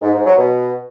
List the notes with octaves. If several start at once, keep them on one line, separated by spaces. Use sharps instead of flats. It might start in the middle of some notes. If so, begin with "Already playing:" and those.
G#2
G#2
F#3
B2